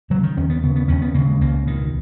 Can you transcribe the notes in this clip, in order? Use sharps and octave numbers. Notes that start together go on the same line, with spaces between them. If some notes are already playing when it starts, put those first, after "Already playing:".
C#3 F#3
D#3
D#2 C#4
B3
C#3 B3
B3
D#2 C#4
B3
C#3 A#3
G#3
C#2 A#3
B2 D#3